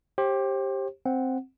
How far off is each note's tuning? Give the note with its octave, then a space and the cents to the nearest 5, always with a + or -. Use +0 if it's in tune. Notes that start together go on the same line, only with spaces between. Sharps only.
G4 +0 C5 +35
C4 +0 F#5 +0